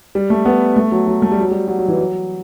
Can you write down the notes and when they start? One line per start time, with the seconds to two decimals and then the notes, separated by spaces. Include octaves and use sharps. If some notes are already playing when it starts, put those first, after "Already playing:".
0.15 G3
0.30 A3
0.45 B3
0.76 A3
0.92 F#3
1.07 F#3
1.22 A3
1.32 G3
1.41 F#3
1.51 G3
1.68 F#3
1.78 F#3
1.88 E3
1.98 F#3